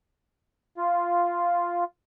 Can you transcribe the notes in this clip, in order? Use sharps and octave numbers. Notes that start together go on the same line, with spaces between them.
F4